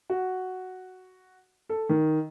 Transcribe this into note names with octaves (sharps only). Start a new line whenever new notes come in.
F#4
A4
D#3